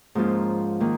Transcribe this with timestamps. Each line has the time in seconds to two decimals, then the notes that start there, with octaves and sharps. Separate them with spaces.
0.15 G#2 F3 A#3 C#4 F4
0.80 D#3 A#3